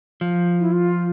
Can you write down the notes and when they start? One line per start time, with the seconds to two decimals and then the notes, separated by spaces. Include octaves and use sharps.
0.21 F3
0.60 E4
0.72 F4